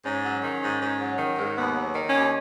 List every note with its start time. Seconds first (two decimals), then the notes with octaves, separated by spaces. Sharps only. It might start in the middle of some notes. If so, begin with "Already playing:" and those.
0.04 G#2 C#4
0.23 F#3
0.43 D#3
0.61 G#2
0.80 G#2
0.99 F#3
1.18 D#3
1.37 G#2
1.56 D#2 B3
1.75 F#3
1.95 D#3
2.07 C#4
2.14 D#2